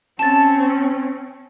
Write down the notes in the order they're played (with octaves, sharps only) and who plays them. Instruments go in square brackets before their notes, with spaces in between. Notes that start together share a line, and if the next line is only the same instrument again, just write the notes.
[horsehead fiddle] C4 C#4 [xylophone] A5 A6